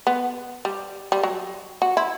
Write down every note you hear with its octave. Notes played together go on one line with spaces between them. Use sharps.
B3
G3
G3
F#3
F#4
E4